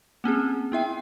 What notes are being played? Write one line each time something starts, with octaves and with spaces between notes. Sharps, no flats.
A#3 C4 C#4 G#4
B3 E4 E5 G5